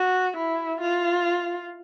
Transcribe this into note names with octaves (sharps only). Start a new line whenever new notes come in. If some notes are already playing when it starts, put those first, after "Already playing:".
Already playing: F#4
E4
F4